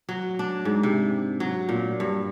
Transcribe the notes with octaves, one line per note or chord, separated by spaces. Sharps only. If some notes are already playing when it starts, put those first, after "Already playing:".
F#3
D4
G#2
C3
F#3
A#2
G2